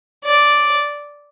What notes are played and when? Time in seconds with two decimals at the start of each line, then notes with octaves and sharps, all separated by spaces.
0.24 D5